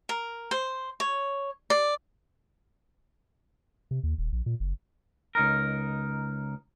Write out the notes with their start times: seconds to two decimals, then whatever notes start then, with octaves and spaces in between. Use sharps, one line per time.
0.09 A#4
0.51 C5
1.00 C#5
1.70 D5
3.91 C3
4.03 D#2
4.18 D#1
4.32 A#1
4.46 A#2
4.60 F#1
5.35 C#2 D#4 A#4